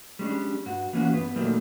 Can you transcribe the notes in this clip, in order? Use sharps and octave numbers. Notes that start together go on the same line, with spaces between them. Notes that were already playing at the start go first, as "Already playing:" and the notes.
G3 G#3 C#4 D4
G2 F#4
E3 A#3 C#4 E4 F#4
G2 B3 B4
A#2 D#3 F#3 G3 A3 A#3